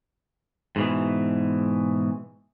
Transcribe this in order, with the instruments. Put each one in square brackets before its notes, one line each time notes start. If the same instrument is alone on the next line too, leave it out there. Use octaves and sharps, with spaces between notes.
[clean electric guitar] G#2 B2 E3